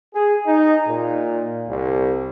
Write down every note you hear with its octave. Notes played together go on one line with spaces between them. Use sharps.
G#4
D#4
A#2
C2